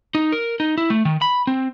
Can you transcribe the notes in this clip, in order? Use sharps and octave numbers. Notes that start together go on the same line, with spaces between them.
D#4
A#4
D#4
E4
A3
D#3
B5
C4